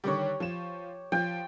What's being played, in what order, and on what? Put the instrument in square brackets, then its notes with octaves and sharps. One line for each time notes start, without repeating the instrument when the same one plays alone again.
[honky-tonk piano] D3 D#3 G3 [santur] G4 C#5
[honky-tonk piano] F3 E7
[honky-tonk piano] F3 [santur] G5